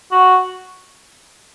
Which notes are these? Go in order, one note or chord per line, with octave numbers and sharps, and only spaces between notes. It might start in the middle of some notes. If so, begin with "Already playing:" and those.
F#4